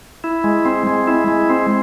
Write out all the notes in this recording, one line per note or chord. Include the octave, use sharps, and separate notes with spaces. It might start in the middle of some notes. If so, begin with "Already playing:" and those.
E4
G#3
C4
G#3
E4
G#3
C4